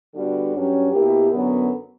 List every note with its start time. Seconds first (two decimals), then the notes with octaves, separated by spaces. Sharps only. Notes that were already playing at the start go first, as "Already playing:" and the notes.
0.15 D3 G3 B3 D4 F#4
0.53 G2 F#3 C#4 G4
0.92 B2 A#3 E4 G4
1.31 F#2 D3 F#3 B3